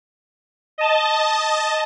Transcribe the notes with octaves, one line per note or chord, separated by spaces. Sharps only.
D#5 A5